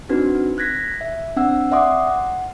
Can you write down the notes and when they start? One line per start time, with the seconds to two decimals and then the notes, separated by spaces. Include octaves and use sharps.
0.09 C4 D4 D#4 F#4 B4
0.58 F#6 G#6 A#6 B6
1.01 E5
1.36 C4 D4 F#5 E6
1.71 D5 E5 F#5 C6 D6 D#6
2.07 F#5